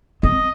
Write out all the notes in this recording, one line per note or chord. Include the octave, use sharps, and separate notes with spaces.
C4 D#5